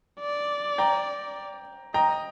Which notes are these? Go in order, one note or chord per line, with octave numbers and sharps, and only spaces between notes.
D5
G5 A#5
D#5 G5 A#5